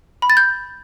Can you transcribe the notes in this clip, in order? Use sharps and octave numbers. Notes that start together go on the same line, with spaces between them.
B5
A6
G6